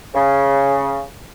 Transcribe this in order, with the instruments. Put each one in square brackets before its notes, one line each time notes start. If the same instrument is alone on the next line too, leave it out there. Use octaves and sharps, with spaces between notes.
[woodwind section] C#3